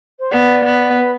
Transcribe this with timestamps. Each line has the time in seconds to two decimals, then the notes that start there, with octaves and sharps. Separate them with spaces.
0.19 C5
0.31 B3 D5
0.64 B3
0.96 B4